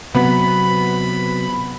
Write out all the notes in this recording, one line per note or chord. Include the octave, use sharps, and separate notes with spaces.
C3 F#3 B3 B5